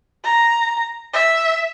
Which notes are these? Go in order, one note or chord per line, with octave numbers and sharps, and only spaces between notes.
A#5
E5